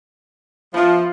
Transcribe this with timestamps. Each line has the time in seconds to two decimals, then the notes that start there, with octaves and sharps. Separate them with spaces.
0.74 F3 B3 F4 C5 E5